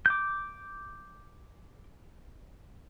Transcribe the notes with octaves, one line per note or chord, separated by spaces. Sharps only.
D6 G6